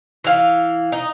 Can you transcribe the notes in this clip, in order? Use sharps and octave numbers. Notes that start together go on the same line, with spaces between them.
E3 F5
D#4